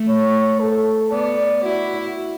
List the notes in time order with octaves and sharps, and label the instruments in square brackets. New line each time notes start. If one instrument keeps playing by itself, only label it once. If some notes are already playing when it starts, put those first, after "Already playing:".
Already playing: [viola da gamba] A3
[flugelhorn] C#5
A4
[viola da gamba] B3 [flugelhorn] D5
[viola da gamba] E4 [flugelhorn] F#4